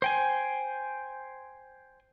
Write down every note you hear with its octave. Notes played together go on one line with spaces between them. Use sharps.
C5 G5 G#5